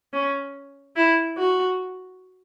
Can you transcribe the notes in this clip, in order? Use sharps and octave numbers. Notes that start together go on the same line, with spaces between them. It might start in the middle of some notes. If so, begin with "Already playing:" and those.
C#4
E4
F#4